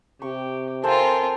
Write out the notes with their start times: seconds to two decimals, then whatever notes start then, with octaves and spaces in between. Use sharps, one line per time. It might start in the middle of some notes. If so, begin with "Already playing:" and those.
0.22 C3 G4 C#6
0.84 C4 F4 A4 A#4 C5 G#5